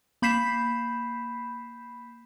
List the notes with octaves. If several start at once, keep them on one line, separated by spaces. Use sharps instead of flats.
A#3 B5 G6 B6 C7 E7